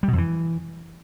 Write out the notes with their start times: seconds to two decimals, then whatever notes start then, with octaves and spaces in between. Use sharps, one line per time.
0.03 G3
0.08 B2
0.13 F2
0.18 E3